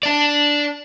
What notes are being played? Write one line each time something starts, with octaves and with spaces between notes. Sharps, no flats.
D4 D5